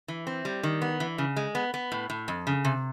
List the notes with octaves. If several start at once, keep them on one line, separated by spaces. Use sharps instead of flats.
E3
C4
G3
D#3
B3
E3
C#3
G#3
B3
B3
A2
A2
F2
C#3
C3